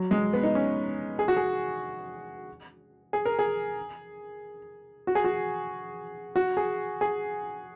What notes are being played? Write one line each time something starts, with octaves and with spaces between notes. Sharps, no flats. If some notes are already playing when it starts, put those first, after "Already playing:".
Already playing: F#3
G#3
B3
D#4
C#4
G#4
F#4
G#4
G#4
A#4
G#4
F#4
G#4
F#4
F#4
G#4
G#4